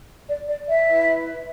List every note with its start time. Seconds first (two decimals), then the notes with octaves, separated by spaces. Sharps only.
0.26 D5
0.46 D5
0.67 E5
0.88 E4 B4